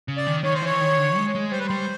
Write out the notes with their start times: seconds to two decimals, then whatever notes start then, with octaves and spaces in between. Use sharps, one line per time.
0.08 C#3
0.17 D5
0.27 D#3
0.44 D#3 C#5
0.55 C5
0.62 E3 C#5
0.81 D#3
0.98 D3
1.16 G#3
1.35 G#3
1.52 G3 C5
1.60 B4
1.67 G3 C5